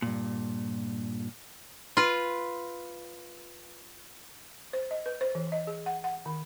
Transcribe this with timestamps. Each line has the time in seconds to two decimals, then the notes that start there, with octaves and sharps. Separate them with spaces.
0.02 G2 A#2
1.97 F4 B4
4.73 C5
4.91 D#5
5.06 B4
5.21 C5
5.35 E3
5.52 D#5
5.67 G#4
5.86 F#5
6.04 F#5
6.26 D#3